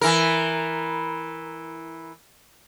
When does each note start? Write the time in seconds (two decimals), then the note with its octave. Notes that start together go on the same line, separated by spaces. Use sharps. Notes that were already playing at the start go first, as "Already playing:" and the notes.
0.01 E3 A#4